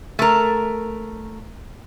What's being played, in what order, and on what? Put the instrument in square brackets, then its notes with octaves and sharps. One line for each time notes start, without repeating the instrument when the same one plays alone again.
[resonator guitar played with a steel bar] A3 A#4